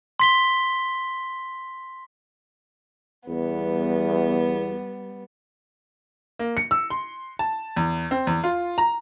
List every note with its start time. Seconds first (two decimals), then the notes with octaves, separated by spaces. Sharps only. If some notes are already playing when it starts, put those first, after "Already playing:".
0.20 C6 B6 G7
3.28 E2 G3 B3
6.39 A#3
6.57 C#7
6.71 E6
6.90 C6
7.39 A5
7.77 E2
8.11 C4
8.27 E2
8.44 F4
8.78 A#5